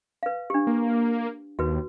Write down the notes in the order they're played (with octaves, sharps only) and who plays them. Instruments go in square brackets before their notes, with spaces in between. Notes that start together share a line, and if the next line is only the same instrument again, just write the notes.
[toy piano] B4 F5
D4 G4
[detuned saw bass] A#3
[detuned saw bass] D#2 [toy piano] F#4 B4